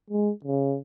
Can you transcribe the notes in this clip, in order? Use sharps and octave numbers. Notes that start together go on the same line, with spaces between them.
G#3
C#3